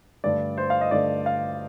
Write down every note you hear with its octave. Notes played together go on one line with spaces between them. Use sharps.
G2 D3 A3 D5
C5
F5
D#5
G2 D3 A3 D5
F5